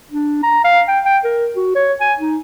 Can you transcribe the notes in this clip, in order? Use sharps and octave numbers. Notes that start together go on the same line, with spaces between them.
D4
A#5
F5
G5
G5
A#4
F#4
C#5
G#5
D#4